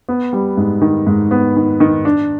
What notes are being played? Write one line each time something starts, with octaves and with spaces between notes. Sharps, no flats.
B3
G3
G#2
D#3
G#2
B3
D#3
D#3
D4